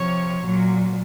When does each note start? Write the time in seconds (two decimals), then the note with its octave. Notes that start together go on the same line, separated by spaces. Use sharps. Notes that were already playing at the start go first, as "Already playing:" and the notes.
Already playing: C3 F3 C#5
0.44 A#2 F#3